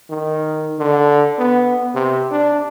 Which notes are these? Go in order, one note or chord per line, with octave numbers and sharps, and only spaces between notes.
D#3
D3
B3
C3
D4